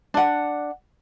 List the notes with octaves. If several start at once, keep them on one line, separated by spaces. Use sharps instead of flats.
D4 F#5